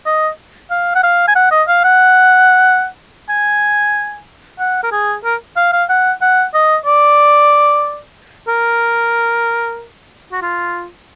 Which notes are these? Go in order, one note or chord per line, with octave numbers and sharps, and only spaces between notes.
D#5
F5
F#5
F5
G#5
F#5
D#5
F5
F#5
G#5
F#5
A#4
G#4
A#4
F5
F5
F#5
F#5
D#5
D5
A#4
F#4
F4